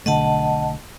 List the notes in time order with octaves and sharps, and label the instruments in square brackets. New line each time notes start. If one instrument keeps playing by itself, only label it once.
[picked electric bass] B1 D3 A3 [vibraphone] D#5 F#5 A5